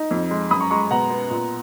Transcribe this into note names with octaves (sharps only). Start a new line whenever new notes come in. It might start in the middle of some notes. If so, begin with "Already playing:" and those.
Already playing: D#4
F2
G#3
F#2 B5 D#6
A#5 C#6
G#3 A#5 C#6
B2 F#5 A#5
B3
A#2